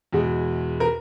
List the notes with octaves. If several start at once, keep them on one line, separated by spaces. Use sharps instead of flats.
E2 B2 G#3
A#4